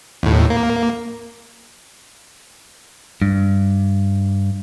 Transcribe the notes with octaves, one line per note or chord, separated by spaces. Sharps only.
D#2 A2
A#3
G2